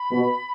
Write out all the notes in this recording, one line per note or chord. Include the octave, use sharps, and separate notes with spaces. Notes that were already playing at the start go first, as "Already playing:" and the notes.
Already playing: B5
B2